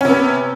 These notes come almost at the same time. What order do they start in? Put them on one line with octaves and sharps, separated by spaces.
C#4 C3 B3